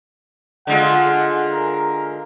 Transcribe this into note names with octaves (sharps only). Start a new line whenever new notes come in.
D3 G#3 F4 F#5
A#4